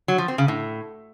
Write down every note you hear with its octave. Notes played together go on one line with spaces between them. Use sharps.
F#3
F3
C4
C#3
A2